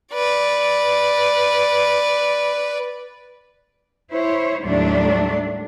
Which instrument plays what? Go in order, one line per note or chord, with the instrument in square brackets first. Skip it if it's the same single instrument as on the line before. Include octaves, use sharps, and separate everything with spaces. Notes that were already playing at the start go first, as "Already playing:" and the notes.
[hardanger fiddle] B4 D5
[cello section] E4 C5 C#5
D#2 A2 F#3 G3 A3 D4